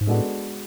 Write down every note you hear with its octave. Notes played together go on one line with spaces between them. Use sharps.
G#2
A2 G#3 B3 D4 F#4 A4